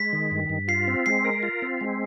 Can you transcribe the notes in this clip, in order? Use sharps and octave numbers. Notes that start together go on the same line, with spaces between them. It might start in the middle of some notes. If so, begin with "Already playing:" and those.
Already playing: G#3 B6
D#3
G2
G2
F4 C7
C4
G#3 C7
A#4
F4
C4
G#3